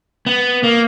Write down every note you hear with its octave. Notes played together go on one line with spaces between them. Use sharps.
B3
A#3